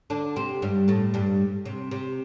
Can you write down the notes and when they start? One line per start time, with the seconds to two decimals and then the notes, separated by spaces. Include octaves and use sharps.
0.10 D3 D4
0.36 C3 C4
0.62 G2 G3
0.88 A2 A3
1.14 G2 G3
1.66 C3
1.91 C3